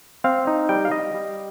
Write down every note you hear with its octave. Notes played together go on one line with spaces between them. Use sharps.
C4 F5
D#4
G3 G5
F5
G3 D#5
G3